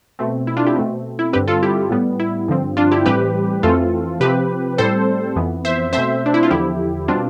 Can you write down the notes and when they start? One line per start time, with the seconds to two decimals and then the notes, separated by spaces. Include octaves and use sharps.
0.19 B2 A3 C4
0.47 E4
0.57 D4 F4
0.66 E4 G4
0.76 B2 A3 C4
1.19 E4
1.33 G2 D3 G3 C4 G4 B4
1.48 F4 A4
1.63 E4 G4
1.90 A2 G3 B3
2.20 E4
2.48 G2 D3 F3 C4
2.77 D4 F4
2.91 E4 G4
3.06 A2 E3 G3 C4 G4 B4
3.63 F2 E3 A3 C4 F4 A4
4.20 C3 F3 C4 G4 B4
4.78 A2 G3 C4 A4 C5
5.36 F2 E3 B3
5.65 C5 E5
5.93 B2 A3 C4 C5 E5
6.26 D4
6.34 E4
6.43 F4
6.50 E2 D3 F3 E4 G4
7.08 B2 G3 C4 D4 F4